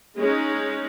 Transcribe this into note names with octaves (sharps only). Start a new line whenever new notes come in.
G#3 C#4 D#4